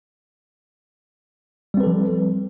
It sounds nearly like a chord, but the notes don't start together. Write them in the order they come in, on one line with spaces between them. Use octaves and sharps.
G3 C4 B4 A4 F3